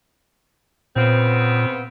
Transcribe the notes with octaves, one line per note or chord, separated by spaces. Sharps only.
A#2 C#3 B3 C4